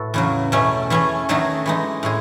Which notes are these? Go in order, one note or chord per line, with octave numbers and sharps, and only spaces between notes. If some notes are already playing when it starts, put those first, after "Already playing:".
Already playing: A2 B3 F#4 A4
E2 C#3 F#3
B2 A3 C#4
E3 A3 C#4 G#4
D#3 F#3 A3 D#4 G#4
E3 G#3 D#4
A2 G#3 G#4